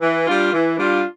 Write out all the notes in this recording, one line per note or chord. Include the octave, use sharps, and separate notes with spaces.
E3
G3 D4 F4
E3
G3 D4 F4